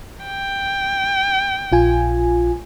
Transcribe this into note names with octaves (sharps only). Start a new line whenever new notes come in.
G5
A#1 F4 G#5